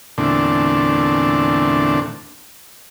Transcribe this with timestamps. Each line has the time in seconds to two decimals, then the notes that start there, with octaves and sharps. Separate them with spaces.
0.18 E2 A#2 D3 A3 C4 D4